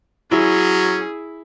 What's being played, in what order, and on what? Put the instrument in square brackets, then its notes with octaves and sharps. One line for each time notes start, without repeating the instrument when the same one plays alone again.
[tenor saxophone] F#3 [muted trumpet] C#4 [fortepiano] E4 [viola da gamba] G#4